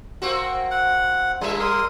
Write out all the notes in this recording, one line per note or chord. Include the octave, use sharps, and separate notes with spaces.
A#3 C4 F#4
F#5
G3 A#3 D4 F4 E5
A#4 C6 D#6